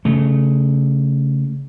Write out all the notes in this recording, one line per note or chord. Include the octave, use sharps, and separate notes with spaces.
C#3 A3